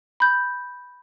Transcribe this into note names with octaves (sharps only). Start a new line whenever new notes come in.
B5 G6